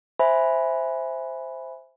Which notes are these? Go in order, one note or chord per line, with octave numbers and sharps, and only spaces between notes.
C5 E5 G#5 B5